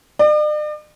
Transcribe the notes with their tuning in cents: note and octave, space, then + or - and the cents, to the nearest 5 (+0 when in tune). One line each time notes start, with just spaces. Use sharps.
D5 +45